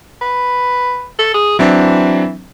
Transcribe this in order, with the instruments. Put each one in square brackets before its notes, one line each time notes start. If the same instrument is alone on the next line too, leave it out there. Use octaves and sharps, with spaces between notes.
[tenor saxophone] B4
A4
G#4
[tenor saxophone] E3 [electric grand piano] F#3 C4 D4